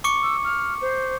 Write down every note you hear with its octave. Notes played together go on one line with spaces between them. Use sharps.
C#6 D6 C#7
E6
F6
C5